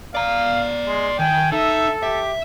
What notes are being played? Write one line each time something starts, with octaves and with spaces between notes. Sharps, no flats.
D5 F5 A#5
G#3 C6
D#3 G5 G#5
D#4 A4 E5
G4 E5